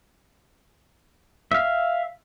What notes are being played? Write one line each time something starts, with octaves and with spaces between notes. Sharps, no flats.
E5 F5